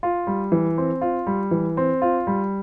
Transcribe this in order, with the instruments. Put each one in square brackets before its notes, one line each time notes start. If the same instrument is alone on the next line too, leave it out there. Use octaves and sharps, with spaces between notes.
[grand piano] F4
G3
E3
C4
F4
G3
E3
C4
F4
G3